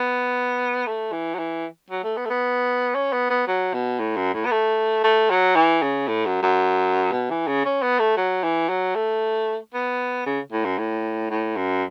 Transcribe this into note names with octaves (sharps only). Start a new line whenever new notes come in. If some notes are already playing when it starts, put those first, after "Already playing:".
Already playing: B3
A3
E3
F#3
E3
F#3
A3
B3
A3
B3
C#4
B3
B3
F#3
B2
A2
F#2
A2
B3
A3
A3
F#3
E3
C#3
A2
F#2
F#2
B2
E3
C#3
C#4
B3
A3
F#3
E3
F#3
A3
B3
C#3
A2
F#2
A2
A2
F#2